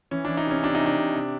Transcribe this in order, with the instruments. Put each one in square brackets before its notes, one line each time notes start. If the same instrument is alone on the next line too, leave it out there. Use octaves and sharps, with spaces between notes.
[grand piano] E3 C#4
E3 D4
D#4
C3 C#4
C3 D4
D#4
C3
D4
C3
C3